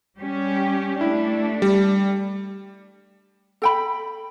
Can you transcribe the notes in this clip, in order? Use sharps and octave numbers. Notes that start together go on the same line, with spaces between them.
G3 C#4 G4
A3 D4 E4
G3
A4 G5 B5